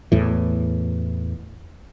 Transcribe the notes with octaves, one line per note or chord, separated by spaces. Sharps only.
E2 A2 E3